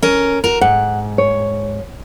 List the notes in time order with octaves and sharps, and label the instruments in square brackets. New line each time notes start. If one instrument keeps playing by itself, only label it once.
[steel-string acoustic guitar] C#4 A#4
F#4 A#4
[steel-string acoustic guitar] G#2 [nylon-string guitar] F#5
[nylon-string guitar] C#5